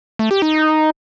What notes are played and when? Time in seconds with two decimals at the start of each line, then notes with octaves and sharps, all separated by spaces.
0.19 A3
0.31 G4
0.42 D#4